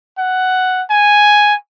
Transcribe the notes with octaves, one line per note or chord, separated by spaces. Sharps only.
F#5
G#5